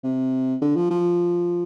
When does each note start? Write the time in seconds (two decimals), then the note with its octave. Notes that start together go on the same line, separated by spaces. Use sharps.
0.04 C3
0.62 D3
0.76 F3
0.91 F3